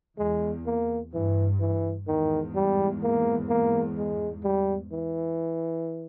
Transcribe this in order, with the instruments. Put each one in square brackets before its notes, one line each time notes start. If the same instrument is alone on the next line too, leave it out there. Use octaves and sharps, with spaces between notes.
[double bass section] E2 [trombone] G#3
[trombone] A#3
[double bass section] G2 [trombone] E3
[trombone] E3
[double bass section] E2 G#2 [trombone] D#3
[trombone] G3
A#3
A#3
G#3
G3
E3